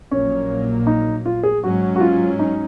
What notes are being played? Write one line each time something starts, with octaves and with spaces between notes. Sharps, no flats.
A#1 A#2 F#3 A#3 C#4
D#4
F4
G#4
G#2 F#3 C#4 F#4
F#4
F4
D#4